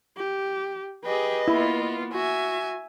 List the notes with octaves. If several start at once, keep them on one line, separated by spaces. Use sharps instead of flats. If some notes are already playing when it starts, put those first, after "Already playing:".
G4
G4 G#4 B4 D#5 G5
A#3 B3 E4 F4
F#4 E5 G#5